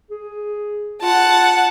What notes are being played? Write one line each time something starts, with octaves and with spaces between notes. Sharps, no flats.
G#4
F4 F#5 A5